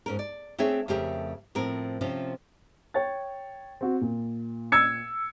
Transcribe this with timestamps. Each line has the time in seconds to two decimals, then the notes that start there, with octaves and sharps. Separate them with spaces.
0.06 G#2 C#4 A#4
0.19 D5
0.58 A3 C4 D4 G#4 C#5 E5
0.88 F2 C#3 A3 G4 A#4 E5
1.55 A2 F3 C4 A#4
2.01 C3 F3 C#4 F4
2.94 C#5 G5 A6
3.81 C4 F#4
4.01 A#2
4.72 E6 G#6 C#7